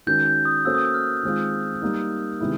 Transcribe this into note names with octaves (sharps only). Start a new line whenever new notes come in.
D#3 G#3 C#4 F#4 A#4 G6
G6
D#6
A#3 C#4 F#4 A4 C5 E6
D#6
E6
F6
D#3 G#3 C4 F4
G3 A#3 D#4
C3 D#3 G#3 B3 E4